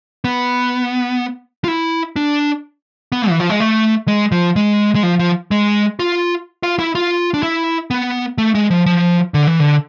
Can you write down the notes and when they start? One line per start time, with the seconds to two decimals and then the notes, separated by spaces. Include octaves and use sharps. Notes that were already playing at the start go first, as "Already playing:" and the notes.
0.24 B3
1.64 F4
1.68 E4
2.16 D4
3.12 B3
3.29 E3
3.40 F3
3.50 G#3
3.60 A3
4.08 G#3
4.32 F3
4.56 G#3
4.95 G#3
5.03 F3
5.19 F3
5.51 G#3
6.00 F4
6.63 F4
6.79 E4
6.95 F4
7.34 D4
7.43 E4
7.91 B3
8.38 A3
8.55 G#3
8.71 F3
8.86 F3
9.34 D3
9.47 E3
9.60 D3